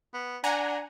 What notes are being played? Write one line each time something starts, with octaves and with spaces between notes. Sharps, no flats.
B3
D4 F#5 G#5 A#5